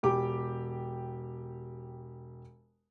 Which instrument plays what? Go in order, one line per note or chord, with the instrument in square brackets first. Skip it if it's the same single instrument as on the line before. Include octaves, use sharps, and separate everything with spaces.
[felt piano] E1 G4 D6